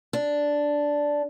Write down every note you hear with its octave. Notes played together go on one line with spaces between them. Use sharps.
D4